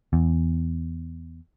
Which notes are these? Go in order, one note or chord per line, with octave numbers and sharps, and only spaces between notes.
E2